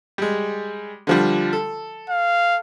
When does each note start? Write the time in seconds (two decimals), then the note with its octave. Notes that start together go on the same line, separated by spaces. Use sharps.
0.18 G3 G#3
1.07 D3 F3 G3
1.53 A4
2.09 F5